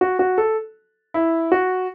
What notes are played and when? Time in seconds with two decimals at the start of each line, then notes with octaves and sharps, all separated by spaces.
0.01 F#4
0.19 F#4
0.38 A4
1.14 E4
1.52 F#4